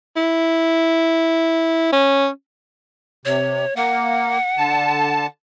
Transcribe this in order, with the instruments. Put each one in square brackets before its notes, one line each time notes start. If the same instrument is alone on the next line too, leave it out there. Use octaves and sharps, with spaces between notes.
[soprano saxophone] E4
C#4
[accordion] C3 [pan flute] C#5
[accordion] A#3 [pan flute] F#5
[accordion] D3 A5